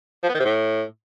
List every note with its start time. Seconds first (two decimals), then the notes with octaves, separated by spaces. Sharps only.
0.23 F3
0.29 B3
0.34 D#3
0.39 C3
0.45 A2